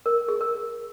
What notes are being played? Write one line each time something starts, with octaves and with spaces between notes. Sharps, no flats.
A#4
G#4
A#4